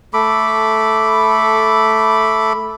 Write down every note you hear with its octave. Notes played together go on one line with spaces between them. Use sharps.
A3 A4 B5 D6